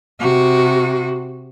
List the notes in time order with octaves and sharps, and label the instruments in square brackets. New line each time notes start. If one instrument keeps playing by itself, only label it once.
[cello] C3 F#4